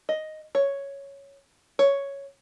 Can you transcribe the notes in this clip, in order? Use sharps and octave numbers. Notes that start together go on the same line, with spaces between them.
D#5
C#5
C#5